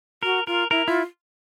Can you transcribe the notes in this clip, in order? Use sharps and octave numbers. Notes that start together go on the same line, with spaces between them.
F#4 A#4
F4 A#4
E4 A#4
E4 F4